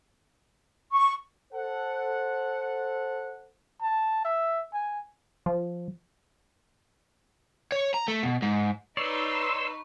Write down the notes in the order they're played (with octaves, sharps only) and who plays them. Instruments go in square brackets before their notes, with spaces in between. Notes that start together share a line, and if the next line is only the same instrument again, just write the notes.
[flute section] C#6
[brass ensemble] A4 C5 F#5
[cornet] A5
E5
G#5
[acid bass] F3
[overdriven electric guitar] C#5
A#5
A3
B2
G#2
[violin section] D#4 B4 [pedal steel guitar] C#5 D5 [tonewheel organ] C6 E6 [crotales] C#6